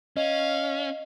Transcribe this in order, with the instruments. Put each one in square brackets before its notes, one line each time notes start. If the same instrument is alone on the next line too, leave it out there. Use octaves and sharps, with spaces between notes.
[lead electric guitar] C#4 [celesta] D#5 [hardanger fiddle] F5